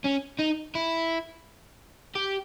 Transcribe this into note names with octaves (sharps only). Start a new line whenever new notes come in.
C#4
D#4
E4
G4